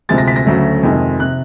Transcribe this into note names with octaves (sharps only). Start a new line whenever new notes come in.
D2 C3 F3 G#3 A6
A#6
B6
A#6
D2 C#3 F#3 A3
F2 C3 D#3 G#3
C3 F#6